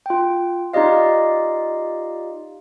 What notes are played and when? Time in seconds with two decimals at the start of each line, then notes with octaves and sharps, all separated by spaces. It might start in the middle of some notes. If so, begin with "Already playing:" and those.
0.06 F4 G5
0.73 D#4 F4 G4 D5 D#5 F5